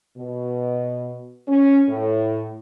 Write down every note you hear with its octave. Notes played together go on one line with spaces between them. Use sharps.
B2
C#4
A2